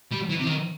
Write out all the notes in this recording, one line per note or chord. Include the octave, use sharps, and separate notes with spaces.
G3
E3
C3
D#3